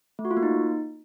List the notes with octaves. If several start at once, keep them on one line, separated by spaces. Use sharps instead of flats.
A3
F#4
F4
A#3
D#4